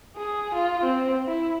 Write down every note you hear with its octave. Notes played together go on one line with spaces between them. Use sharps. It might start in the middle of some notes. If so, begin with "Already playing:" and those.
G#4
F4
C4
E4